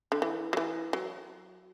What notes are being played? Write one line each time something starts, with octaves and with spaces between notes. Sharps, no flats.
D3
E3
F#3
E3
F#3